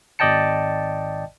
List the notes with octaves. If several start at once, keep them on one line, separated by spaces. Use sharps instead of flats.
G#1 D5 D#5 G5 A5 C#7